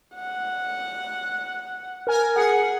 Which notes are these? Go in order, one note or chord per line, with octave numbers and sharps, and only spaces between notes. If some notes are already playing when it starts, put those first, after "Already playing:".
F#5
A#4 G#5
G#4 F#5